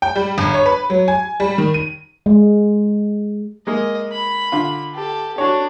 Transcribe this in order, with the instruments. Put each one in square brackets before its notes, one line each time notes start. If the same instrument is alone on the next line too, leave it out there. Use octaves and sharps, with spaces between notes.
[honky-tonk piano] G5
G3
G1
C#5
B4
F#3
G#5
G3
D#3
D#7
[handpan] G#3
[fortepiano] G#3 A#3 [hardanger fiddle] D#5
[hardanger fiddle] B5
[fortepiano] D3 F4
[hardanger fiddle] G4 A4
[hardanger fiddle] D4 [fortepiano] F#4 C#5